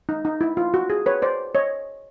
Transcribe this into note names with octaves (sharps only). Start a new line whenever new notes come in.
D#4
D#4
E4
F4
F#4
G#4
B4 C#5
C5 D5
C#5 D#5